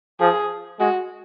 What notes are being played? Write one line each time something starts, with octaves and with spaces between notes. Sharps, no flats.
F3 G#4
G#3 F#4